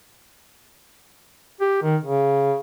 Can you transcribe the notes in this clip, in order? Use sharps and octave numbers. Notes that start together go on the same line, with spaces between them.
G4
D#3
C#3